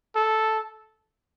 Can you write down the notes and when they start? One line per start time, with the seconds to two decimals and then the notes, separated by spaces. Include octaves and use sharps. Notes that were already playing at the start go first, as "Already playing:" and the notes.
0.16 A4